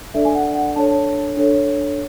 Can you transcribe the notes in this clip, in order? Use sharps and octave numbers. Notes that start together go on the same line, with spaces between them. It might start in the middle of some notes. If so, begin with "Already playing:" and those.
D4 A4 D5 E5
G#5
F#5
F#5
D4 A4 C#5 A5
D4 A4 C#5